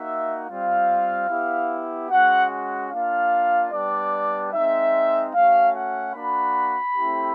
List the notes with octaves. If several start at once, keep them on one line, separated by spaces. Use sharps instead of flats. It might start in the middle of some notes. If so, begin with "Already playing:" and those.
Already playing: A#3 D#4 F#4 E5
G3 C4 F4 F5
B3 E4 G4
G#3 C#4 F#4 F#5
F#5
A#3 D4 F4 F5
G3 B3 D4 G4 D5
G#3 C4 D#4 E5
A3 C#4 F#4 F5
F#5
A#3 D4 F#4 B5
A3 C4 E4 G4